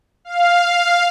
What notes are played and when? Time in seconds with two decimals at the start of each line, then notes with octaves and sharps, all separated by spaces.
0.25 F5